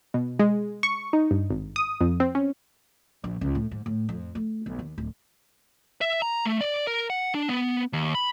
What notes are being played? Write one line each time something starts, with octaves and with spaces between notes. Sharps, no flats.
B2
G#3
C#6
D#4
G2
G#1
D#6
F2
C4
C#4
A#1
C#2
A2
G#2
A2
F2
A3
B1
D#2
D1
E5
A#5
A3
D5
A#4
F#5
D4
B3
D#2
B5